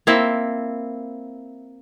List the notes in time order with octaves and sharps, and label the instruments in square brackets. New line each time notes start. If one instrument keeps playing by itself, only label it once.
[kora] A#3 C4 E4